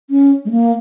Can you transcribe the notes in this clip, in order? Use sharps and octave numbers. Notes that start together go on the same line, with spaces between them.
C#4
G#3
A#3